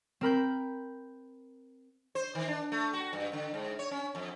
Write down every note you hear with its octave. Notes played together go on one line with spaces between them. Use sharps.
C4 A#4 B5 G6
C5
D#3
D4
A3
F#4
G2
D3
G#2
C#5
C#4
F2